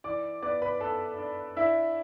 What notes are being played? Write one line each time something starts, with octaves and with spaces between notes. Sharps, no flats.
E3 D5 D6
B3 D5 D6
B4 B5
B3 A4 A5
D4
D4 E4 E5